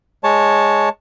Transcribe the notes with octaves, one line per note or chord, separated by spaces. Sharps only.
G#3 C#5 A5